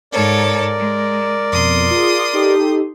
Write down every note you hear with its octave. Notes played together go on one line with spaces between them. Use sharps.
G#2 A4 A#4 C#5 D5
G#3
F2 B2 C6 D#6
F4 G#4
D#4 G4 A4